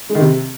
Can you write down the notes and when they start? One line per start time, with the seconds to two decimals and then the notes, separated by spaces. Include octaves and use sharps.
0.10 G#3
0.15 D#3
0.21 C3